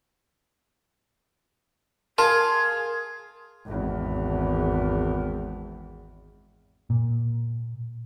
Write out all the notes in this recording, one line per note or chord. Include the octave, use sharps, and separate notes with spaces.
F4 G#4 A#4 A5
G#1 E2
A#2